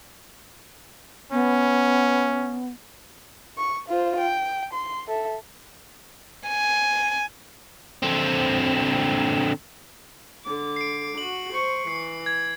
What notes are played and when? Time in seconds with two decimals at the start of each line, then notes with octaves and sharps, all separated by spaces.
1.32 B3 C#4
3.58 C#6
3.88 F4 C5
4.18 G5
4.73 C6
5.08 A4 E5
6.48 G#5
8.03 D3 C4
10.44 D3 D6
10.76 C7 D7
11.18 F#4 F#7
11.53 C5 C#6
11.87 E3 C7
12.26 G#6